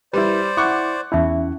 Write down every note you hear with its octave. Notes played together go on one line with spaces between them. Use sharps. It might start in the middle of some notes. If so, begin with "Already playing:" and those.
G3 E4 B4 C5 D5
E4 F#5 C#6 D6
E2 C#4 D#4 E4 E5